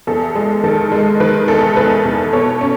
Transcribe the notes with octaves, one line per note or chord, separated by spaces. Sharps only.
E2 A4
G#3
D#3 A4
G#3
D#3 B4
E2 A4
E2 B4
E2
B2 A4 C#5
C#4